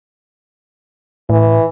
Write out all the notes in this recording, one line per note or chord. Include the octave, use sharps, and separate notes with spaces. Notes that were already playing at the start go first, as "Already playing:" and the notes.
A2 E3